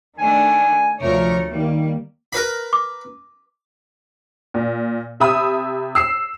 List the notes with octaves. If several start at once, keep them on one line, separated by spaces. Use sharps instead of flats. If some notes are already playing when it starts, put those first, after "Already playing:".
D#3 A3 D4 G#5
D2 C3 F3 A3 A#4 C#5
D#3 G3 A#3
A#4 B4 B5
D6
A#2
C3 E5 B5 D#6 E6
E6 C7